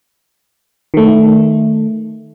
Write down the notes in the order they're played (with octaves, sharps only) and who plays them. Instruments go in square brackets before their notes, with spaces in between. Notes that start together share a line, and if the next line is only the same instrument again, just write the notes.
[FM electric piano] D#3 A3